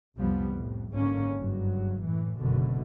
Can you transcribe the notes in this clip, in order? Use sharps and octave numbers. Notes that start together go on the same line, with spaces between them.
C2 F2 F3 G3 B3
F2 A2
G#1 G#2 D3 A#3 C#4
F#1 G2 F#3
A2 E3
F#1 B2 D3 D#3